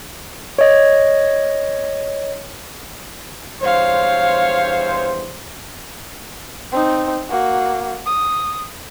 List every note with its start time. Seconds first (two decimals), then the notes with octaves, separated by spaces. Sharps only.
0.59 C#5 D#5
3.60 E2 G2 C5 C#5 F5
6.72 C4 D#4
7.30 A#3 F#4
8.06 D#6